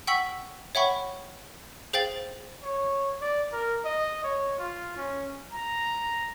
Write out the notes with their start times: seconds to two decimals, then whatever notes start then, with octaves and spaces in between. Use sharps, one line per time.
0.07 F#5 G5 C#6 E6 B6 F#7
0.75 C#5 E5 F#5 G5 B5 C#6
1.93 G#4 C5 F5 G5 A6 F#7
2.63 C#5
3.21 D5
3.52 A#4
3.85 D#5
4.24 C#5
4.58 F4
4.97 C#4
5.51 A#5